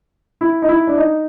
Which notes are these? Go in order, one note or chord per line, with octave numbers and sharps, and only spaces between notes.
E4
D#4
E4
D4
D#4